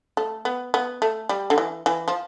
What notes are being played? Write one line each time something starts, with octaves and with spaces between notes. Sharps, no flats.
A3
B3
B3
A3
G3
D3
E3
E3
F3